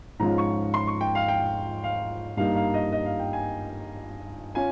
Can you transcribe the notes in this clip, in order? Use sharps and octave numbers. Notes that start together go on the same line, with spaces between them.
G#2 F3 G#3 C#4 F4 A#5
C#6
C6
C#6
G5
F5
G5
F5
G2 G3 A#3 D#4 F5
F5
D#5
D#5
F5
G5
G#5
C#4 F4 G#5